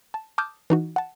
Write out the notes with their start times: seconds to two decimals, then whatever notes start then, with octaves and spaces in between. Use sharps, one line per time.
0.14 A5
0.38 A5 D6 D#6 F6 G6
0.70 E3 D#4 F#4
0.96 F#5 A5